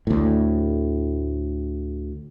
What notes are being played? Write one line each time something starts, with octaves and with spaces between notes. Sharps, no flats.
D2 A2